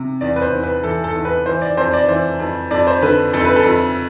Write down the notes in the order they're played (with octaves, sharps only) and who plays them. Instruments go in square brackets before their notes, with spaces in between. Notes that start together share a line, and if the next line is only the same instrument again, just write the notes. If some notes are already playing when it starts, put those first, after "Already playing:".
Already playing: [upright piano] C3
E2 D5
B4
C5
E2
B4
E3 A4
A4
E2
B4
E3 C5
D5
F2 C5
D5
E3 C5
F2
F2 D5
C5
D3 B4
F2 A4
B4
A4
F2